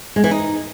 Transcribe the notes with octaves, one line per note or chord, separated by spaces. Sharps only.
G#3
E3
D#4